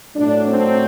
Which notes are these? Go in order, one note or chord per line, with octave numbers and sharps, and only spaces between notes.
A2 F#3 A3 D4
C4